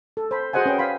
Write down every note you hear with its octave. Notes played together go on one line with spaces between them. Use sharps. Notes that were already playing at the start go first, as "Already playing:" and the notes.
A4
C5 B5
F#4 G#4 C5 D#5 F#5 G#5
C#4 B4 G5
F5 G#5 B5 C6